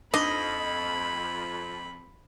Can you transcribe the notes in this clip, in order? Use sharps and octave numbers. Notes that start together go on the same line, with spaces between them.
F2 D4 D#4 D#5 B5